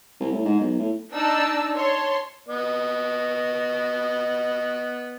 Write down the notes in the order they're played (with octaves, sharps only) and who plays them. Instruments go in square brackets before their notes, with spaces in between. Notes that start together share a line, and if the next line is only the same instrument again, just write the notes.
[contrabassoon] C2
A2
G#2
B1
A2
[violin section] D4 D#4 D5 A5 E6
C#5 A5 C6
[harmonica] B3 D#5